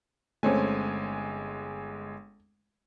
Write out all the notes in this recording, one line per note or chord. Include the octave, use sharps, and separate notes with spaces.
G1 G#3 A3 C4 C#4 G#5